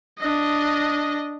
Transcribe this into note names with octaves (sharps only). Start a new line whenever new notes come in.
D4 D#5